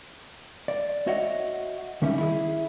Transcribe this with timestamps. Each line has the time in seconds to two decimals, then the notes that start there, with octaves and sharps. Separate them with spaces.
0.68 D5
1.07 F#4 C#5 D#5 E5 F#5
2.02 D#3 G3 C#4 E5
2.18 E4 G#4